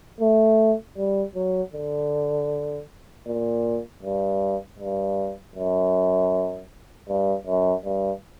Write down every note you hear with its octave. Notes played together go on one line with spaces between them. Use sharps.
A3
G3
F#3
D3
A#2
G2
G2
F#2
G2
F#2
G2